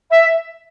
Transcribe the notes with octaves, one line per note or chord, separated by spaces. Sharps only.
E5